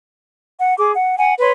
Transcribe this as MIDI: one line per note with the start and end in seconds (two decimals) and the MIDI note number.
0.59 0.76 78
0.78 0.91 68
0.78 0.91 86
0.96 1.19 78
1.19 1.33 78
1.19 1.33 80
1.40 1.51 71
1.40 1.51 73
1.40 1.51 84